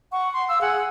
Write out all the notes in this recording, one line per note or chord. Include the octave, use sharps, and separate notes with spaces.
F#5 C#6
C6
F5 E6
G#4 F#5